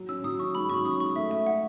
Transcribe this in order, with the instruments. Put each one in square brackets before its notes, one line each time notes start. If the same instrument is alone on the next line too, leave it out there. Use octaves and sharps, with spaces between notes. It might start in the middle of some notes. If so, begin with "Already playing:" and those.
Already playing: [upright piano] F#3
[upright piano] C#4 [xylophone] E6
[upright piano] F#3 [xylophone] D#6
[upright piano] C#4 [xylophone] C#6
[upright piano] G#2 [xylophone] B5
[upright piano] F#3 [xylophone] C#6
[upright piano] C#4 [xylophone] D#6
[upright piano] G#2 [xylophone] C#6
[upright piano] A3 [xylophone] E5
[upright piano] A3 [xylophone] E5
[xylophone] F#5